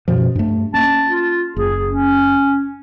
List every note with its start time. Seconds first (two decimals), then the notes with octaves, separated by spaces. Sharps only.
0.08 F#2 B2 F3
0.35 G2 A3
0.74 A#3 C#4 A5
1.08 F4
1.56 F#1 G#4
1.89 C#4